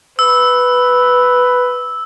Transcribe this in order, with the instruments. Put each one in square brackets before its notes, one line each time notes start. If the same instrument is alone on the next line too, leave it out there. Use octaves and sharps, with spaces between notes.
[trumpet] B4 [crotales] E6